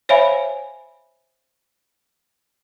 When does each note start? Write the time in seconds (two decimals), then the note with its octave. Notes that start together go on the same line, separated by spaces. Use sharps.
0.09 C5 C#5 E5 F5 G#5 B5